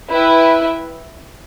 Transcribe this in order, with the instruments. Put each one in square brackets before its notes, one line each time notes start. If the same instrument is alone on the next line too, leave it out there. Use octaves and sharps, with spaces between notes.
[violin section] E4 B4 E5 G5